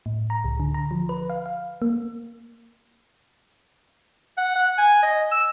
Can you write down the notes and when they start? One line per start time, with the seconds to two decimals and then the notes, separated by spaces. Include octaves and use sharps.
0.06 A2
0.30 A#5
0.44 C#2
0.60 D3
0.74 A#5
0.91 F3
1.09 B4
1.30 F5
1.46 F5
1.82 A#3
4.37 F#5
4.56 F#5
4.78 G#5
5.03 D#5
5.32 E6